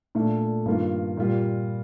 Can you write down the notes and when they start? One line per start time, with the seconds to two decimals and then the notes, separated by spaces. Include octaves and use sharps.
0.15 A#2 A3 D4 A4
0.66 G2 D#3 A#3 F4
1.17 A#2 G3 A#3 F4